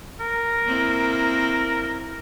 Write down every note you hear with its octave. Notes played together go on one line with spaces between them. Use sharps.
A#4
A#3 C4 E4